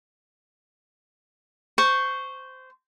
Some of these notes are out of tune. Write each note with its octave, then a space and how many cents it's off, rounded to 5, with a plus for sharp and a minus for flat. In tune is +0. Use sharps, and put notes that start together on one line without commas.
C5 -15 C#6 +0